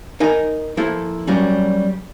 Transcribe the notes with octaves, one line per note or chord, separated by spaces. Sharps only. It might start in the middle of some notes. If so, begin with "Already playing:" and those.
D#4 A#4 D#5 G#5
F3 A#3 E4 A4 C5
F#3 G3 A#3 C#4